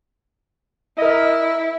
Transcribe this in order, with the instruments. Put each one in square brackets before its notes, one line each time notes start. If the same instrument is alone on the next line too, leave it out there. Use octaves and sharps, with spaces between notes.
[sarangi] E4 [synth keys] A#4 D#5